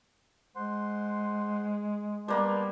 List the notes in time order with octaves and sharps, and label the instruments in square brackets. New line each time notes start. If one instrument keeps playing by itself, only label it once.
[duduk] G#3 [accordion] C5 F#5 C6
[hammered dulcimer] G3 A#3 B3 [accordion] B4 A5 C6